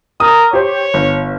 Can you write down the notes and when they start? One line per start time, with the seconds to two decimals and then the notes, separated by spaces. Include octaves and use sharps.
0.20 A#4 D#6
0.53 G4 C5 C#5
0.94 G1